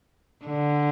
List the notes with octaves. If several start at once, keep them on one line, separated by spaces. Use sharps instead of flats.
D3